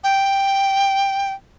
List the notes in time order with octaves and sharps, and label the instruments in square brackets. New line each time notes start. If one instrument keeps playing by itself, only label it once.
[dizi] G5